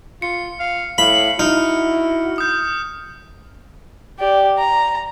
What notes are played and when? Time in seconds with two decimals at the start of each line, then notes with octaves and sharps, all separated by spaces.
0.22 F4 C#7
0.60 F5
0.98 A2 F5 B5
1.39 D#4 E4 F#4 F6
2.38 D#6 G6
4.19 G4 D5
4.58 A#5